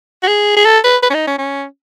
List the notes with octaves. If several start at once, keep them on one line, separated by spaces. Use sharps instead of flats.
F#4
G#4
G#4
A4
B4
B4
C#4
D#4
C#4
C#4